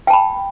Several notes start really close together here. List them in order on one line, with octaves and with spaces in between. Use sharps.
G5 A5 B5